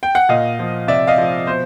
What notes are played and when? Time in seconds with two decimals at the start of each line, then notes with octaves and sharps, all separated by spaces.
0.03 G5
0.15 F#5
0.29 A#2 D#5 F5
0.59 F3
0.88 C3 D5 E5
1.07 D#5 F5
1.17 F3
1.47 B2 C5